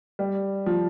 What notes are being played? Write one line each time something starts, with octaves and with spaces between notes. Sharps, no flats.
G3
F3